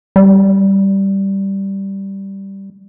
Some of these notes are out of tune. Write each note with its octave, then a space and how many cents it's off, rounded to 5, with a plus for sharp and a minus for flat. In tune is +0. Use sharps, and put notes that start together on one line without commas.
G3 -5